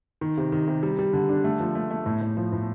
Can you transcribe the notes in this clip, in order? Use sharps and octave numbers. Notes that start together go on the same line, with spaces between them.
D#3
C3
D#3
C3
G3
G3
D3
D4
A3
F3
A3
A3
A2
A2
F3
A2